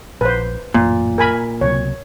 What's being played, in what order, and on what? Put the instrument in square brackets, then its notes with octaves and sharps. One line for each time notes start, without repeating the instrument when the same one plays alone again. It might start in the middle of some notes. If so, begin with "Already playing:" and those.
[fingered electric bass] A#1 [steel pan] B4 C5
[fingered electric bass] A1 F#2 A#3 [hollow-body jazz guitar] A#2
[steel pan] A#4 G#5 B5
[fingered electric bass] C#2 C3 F#3 [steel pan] C#5